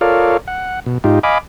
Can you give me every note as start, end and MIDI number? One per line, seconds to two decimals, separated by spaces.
0.01 0.37 65
0.01 0.37 69
0.01 0.37 70
0.01 0.37 73
0.01 0.37 74
0.01 0.37 77
0.48 0.80 78
0.86 0.98 47
1.04 1.19 44
1.04 1.19 63
1.04 1.19 65
1.04 1.19 67
1.23 1.38 75
1.23 1.38 77
1.23 1.38 80
1.23 1.38 83
1.23 1.38 86